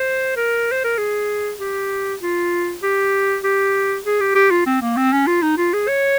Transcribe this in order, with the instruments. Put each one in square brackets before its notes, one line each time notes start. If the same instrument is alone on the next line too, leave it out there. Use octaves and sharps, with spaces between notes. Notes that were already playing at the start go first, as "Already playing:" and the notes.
Already playing: [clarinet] C5
A#4
C5
A#4
G#4
G4
F4
G4
G4
G#4
G4
G4
F4
C4
A#3
C4
C#4
F4
D#4
F4
G#4
C#5